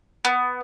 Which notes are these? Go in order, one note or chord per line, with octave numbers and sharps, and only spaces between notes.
B3